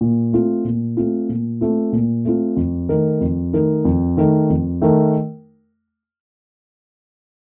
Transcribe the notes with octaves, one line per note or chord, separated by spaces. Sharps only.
A#2
A3 C4 F4
A#2
A3 C4 F4
A#2
A3 C4 F4
A#2
A3 C4 F4
F2
D#3 A3 D#4 A#4
F2
D#3 A3 D#4 A#4
F2
D#3 A3 D#4 A#4
F2
D#3 A3 D#4 A#4